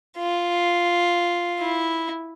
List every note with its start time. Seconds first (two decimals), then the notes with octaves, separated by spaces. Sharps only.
0.18 F4
1.60 E4